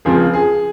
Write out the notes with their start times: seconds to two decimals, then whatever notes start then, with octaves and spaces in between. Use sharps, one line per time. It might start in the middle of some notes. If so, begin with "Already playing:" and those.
0.05 C#2 C#3 F3 C4 G#4
0.33 G#4